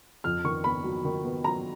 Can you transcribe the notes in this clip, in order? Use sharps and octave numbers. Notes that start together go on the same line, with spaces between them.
F2 F6
D#3 C#6
B3 B5
F#3
D#3
B3
F#3 A#5